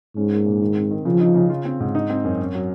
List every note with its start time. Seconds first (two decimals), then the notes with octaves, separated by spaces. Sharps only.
0.17 G#2 C#4
0.32 A#3
0.46 A#2
0.61 D#3
0.77 C4
0.91 D#3
1.05 C#3 F3
1.20 D#4
1.35 C#3
1.50 F4
1.65 C4
1.80 G#2
1.95 D#4
2.10 C4
2.25 F#2
2.39 C#4
2.55 F#3